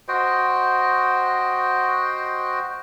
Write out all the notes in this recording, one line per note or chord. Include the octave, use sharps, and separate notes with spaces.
F#4 C5 D#5 G5